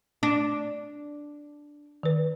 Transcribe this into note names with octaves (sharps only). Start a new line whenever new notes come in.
D4
D#3 B4